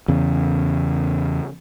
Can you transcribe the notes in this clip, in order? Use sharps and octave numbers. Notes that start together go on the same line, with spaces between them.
E2 C#3